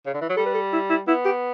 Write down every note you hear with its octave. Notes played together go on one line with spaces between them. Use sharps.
C#3
D3
E3
F#3
G3 A4
B4
A4
E4
E4
B3 E4
G4